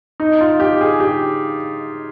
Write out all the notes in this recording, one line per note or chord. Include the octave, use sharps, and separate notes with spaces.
D#4
F4
G4
G#4
G4